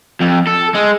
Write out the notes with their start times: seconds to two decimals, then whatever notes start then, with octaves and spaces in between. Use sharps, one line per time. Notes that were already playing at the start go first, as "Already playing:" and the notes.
0.21 F2
0.47 A4
0.75 G#3